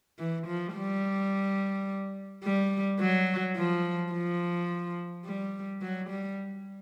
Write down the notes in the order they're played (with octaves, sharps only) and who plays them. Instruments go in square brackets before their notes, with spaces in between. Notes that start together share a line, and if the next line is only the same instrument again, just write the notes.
[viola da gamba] E3
F3
G3
G3
F#3
F3
F3
G3
F#3
G3